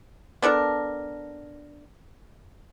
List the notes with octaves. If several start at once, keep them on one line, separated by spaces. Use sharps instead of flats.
B3 D4 A4 A#4